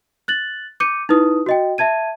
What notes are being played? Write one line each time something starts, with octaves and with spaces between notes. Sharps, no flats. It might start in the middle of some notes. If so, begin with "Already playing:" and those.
F#6 A6 F#7
D6 G6 C#7 D#7
D#4 E4 B4 D#6
F#4 D#5 G5
E5 A5 G#6 D#7